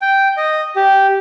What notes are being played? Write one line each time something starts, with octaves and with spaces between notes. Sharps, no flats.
G5
D#5
G4